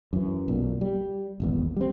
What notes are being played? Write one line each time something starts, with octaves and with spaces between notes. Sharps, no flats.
F#2 E3
B1 A#2
G3
D#1 G#1 E2
G3 C4